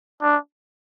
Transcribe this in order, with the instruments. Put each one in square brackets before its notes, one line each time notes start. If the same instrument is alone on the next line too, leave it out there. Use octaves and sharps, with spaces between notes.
[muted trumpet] D4